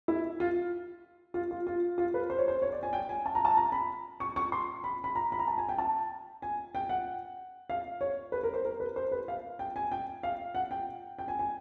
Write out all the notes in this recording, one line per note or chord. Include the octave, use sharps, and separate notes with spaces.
E4
F4
F4
F4
F4
F4
B4
C5
C#5
C5
C#5
D5
G#5
G5
G#5
A5
A#5
A5
A#5
B5
C#6
C#6
C6
B5
B5
A#5
B5
A#5
A5
G#5
G5
A5
G#5
G5
F#5
F5
C#5
B4
A#4
C5
A#4
B4
C5
B4
F5
G5
G#5
G5
F5
F#5
G5
G5
G#5
G#5